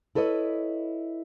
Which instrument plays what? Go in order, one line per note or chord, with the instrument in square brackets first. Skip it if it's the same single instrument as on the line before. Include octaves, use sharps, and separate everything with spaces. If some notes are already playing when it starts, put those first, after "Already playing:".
[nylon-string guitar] E4 A4 B4 C#5 D#5